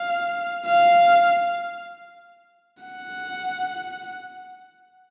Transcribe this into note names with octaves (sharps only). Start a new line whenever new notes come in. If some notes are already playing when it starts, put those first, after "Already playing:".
Already playing: F5
F5
F#5